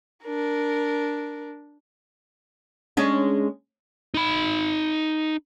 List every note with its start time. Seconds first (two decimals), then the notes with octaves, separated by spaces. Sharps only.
0.24 D4 A#4
2.97 G#3 C#4 D4
4.14 D#4 B5